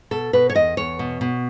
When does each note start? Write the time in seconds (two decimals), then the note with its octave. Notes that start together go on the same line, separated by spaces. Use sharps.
0.11 B2 A4
0.33 B2 B4
0.50 C#5
0.55 E2 D#5
0.77 E2 C#5
0.99 B2
1.21 B2